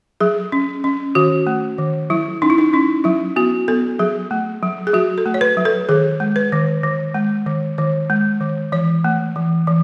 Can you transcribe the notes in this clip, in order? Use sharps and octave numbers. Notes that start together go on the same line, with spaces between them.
F#3 G#4
C#4
C#4
D#3 F#4
A3
D#3
F#3 E4
C#4 D#4
E4
D#4
C#4 E4
F#3 E4
B3 F#4
B3 A4
F#3 G#4
A3
F#3
G#4
F#3 F#4
A4
A3
C#5
B4
F#3
A4
D#3 G#4
G#3
B4
D#3
D#3
G#3
D#3
D#3
G#3
D#3
E3 C#5
A3
E3
E3